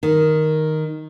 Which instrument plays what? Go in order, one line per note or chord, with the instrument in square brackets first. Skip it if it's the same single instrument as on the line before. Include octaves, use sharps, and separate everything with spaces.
[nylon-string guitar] D#3